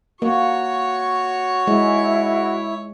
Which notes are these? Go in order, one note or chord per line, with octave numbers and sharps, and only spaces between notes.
A#3 F#4 C#5 C#6
G#3 E4